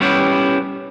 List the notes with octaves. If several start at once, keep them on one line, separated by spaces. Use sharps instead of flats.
G3 B3 C#4 E4 G4